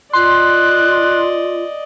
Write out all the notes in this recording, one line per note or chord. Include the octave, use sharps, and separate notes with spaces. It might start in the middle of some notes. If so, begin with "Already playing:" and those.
F4 D5 D#5 C6 F#6